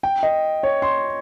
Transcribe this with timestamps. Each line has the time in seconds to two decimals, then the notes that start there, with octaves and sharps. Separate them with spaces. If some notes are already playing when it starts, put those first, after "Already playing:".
0.03 G5
0.23 D#5
0.63 C#5
0.82 C6